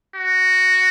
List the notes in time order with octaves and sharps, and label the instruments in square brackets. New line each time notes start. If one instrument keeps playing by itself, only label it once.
[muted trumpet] F#4